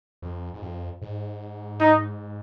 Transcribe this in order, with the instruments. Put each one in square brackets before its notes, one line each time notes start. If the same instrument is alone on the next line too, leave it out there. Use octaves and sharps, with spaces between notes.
[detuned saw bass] F2
G#2
F2
G#2
[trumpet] D#4